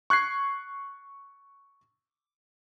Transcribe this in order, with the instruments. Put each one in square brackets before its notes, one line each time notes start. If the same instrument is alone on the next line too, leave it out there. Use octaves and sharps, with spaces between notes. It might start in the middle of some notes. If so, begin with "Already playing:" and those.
[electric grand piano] C#6 F#6 G#6 C7